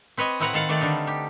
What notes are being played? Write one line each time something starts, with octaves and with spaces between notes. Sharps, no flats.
C4 B4 C#5 D#5
A2 C4 E4 B4 F#5 A#5
D#3 A4 F5 F#5
D#3 A3 D5 A5
D3 G3 D#4
G4